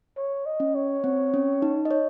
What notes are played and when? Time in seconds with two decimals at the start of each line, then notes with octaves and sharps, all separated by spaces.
0.17 C#5
0.46 D#5
0.60 C#4
0.75 C#5
1.04 C4
1.34 C#4
1.62 D#4
1.85 D#5
1.91 C#5